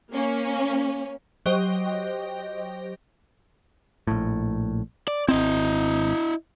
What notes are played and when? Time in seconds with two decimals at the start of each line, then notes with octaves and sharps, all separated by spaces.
0.12 A#3 C#4
1.46 F#3 G4 C5 D#5 G5
4.07 A#1 A2
5.08 D5
5.29 G#1 C4 E4 D#5